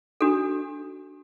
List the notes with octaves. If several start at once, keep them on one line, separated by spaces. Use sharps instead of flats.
D4 F#4 A4